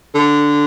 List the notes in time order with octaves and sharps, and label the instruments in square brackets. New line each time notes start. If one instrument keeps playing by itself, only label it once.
[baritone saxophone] D3